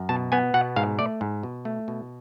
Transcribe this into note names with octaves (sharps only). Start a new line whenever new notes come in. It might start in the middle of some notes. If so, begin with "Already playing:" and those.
Already playing: F#2
B2 A5
B3 G#5
B2 F#5
G#2 F5
A3 D5
G#2
B2
A3
B2